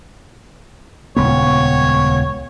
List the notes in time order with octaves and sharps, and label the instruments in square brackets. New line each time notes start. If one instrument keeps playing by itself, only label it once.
[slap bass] D#1 C#2 B3 [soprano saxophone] C#5